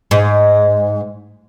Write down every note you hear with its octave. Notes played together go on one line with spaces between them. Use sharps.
G#2